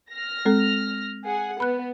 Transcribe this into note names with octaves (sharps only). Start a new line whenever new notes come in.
F6 A#6
G#3 C4 A4
G#4 F#5
B3 B5 F#6